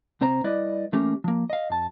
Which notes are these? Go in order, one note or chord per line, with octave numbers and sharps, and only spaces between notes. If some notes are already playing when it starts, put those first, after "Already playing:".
C2 C4 C5 A#5
G3 E4 B4 D5 D#5
E3 A3 A#3 C#4 G4
F3 A#3
D#5 F5
F2 A5